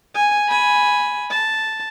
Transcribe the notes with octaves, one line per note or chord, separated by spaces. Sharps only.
G#5
G#5 B5
A5